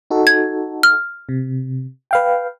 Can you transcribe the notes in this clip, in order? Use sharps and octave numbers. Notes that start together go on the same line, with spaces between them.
D#4 F#4 A4
G#6
F6
C3
B4 F5 G5